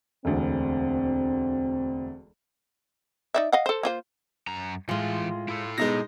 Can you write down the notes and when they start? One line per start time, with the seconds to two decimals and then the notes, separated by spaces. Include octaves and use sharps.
0.25 E1 D2 C4
3.34 D#4 D5 E5
3.52 D#5 F5 F#5
3.66 A4 C5
3.83 A#3 F4 C5
4.47 F#2 A#5
4.89 A2 E3 G#3 F4 C6
5.49 E4 A4
5.78 B2 G#3 D#4 A#6